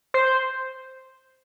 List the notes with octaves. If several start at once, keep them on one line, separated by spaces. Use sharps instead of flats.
C5